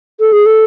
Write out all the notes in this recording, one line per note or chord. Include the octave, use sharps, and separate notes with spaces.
A4
G#4
A4